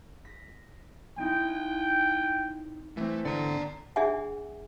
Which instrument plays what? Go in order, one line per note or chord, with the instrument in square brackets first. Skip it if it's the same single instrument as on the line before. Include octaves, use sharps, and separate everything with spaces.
[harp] A#6 B6
[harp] C4 D#4 E4 [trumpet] G5
[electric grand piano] E3 C4 [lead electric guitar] A3
[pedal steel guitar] D3 [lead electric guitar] D5 A#5
[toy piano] D4 G#4 D#5 E5 F#5 G#5